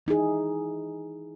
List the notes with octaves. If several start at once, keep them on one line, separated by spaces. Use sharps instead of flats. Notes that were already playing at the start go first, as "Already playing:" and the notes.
E3 D#4 E4 G#4